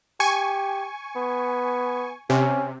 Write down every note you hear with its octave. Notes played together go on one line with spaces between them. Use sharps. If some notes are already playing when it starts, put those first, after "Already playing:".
G4 G#5 C#6
B3
C3 C#4